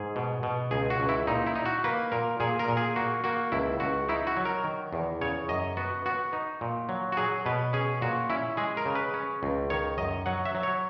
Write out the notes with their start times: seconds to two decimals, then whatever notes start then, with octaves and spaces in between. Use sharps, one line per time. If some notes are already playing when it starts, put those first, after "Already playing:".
Already playing: G#2 G#4
0.16 B2
0.43 B2
0.71 C#2 G#4
0.90 F#4
1.00 C#2
1.09 E4
1.27 A#2 D#4
1.46 E4
1.55 D#4
1.66 F#4
1.84 A#3 B4
2.12 A#2 A#4
2.40 A#2 G#4
2.59 A#4
2.68 A#2
2.77 G#4
2.96 A#3 F#4
3.24 A#3 F#4
3.52 C#2 E4
3.80 C#2 F#4
4.09 D#4 E4
4.27 F#4
4.37 F#3
4.45 A#4
4.64 D#3
4.93 E2
5.21 C#3 C#5
5.49 F#2 D#5
5.77 B3 F#4
6.06 B3 F#4
6.33 D#4
6.61 A#2
6.89 F#3
7.12 F#4
7.17 F#3 G#4
7.46 B2 B4
7.73 C#4 G#4
8.02 A#2 F#4
8.30 C#4 E4
8.57 G#3 G#4
8.77 A#4
8.86 C#3
8.95 B4
9.14 C#4
9.43 C#2
9.70 D#3 C#5
9.98 F#2 D#5
10.26 F#3 F#5
10.45 E5
10.55 F#3
10.63 C#5